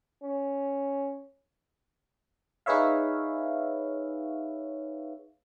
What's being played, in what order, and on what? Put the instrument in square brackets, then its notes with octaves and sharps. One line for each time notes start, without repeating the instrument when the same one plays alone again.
[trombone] C#4
[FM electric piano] D#4 G#4 B4 C#5 E5 F5